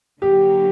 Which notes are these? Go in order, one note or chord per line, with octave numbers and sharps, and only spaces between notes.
D3 F#3 A#3 G4